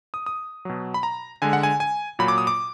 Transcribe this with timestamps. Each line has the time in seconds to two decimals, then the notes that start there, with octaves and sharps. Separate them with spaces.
0.14 D#6
0.26 D#6
0.65 B2 F#3
0.94 B5
1.03 A#5
1.42 D3 G#3 G#5
1.53 F#5
1.63 G#5
1.80 G#5
2.19 A#2 F#3 B5
2.28 D6
2.38 D#6
2.47 D6